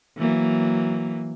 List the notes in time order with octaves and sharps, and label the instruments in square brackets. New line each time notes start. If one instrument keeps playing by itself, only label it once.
[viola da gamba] E3 F#3 A#3